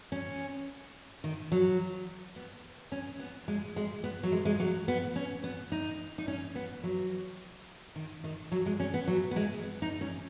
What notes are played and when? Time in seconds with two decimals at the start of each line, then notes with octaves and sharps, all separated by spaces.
0.12 C#4
1.24 D#3
1.52 F#3
2.36 B3
2.92 C#4
3.20 B3
3.48 G#3
3.76 G#3
4.04 B3
4.23 F#3
4.32 G#3
4.45 G#3
4.60 F#3
4.88 B3
5.16 C#4
5.44 B3
5.72 D#4
6.18 D#4
6.28 C#4
6.55 B3
6.84 F#3
7.96 D#3
8.24 D#3
8.52 F#3
8.66 G#3
8.80 C#4
8.94 B3
9.08 F#3
9.31 B3
9.36 G#3
9.63 B3
9.82 D#4
10.01 C#4